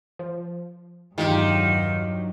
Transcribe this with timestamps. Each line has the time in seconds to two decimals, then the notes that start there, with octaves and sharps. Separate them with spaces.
0.19 F3
1.18 E2 G2 D#3 F#3 G#3 F4 G4